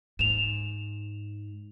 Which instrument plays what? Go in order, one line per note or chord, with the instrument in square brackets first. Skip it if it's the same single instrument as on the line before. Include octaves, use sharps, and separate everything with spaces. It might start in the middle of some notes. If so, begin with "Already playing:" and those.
[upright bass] G#2 [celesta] E7 F7